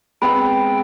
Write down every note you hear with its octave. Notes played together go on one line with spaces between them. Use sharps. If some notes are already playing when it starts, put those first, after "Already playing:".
G#3 B3 C4 G5 B5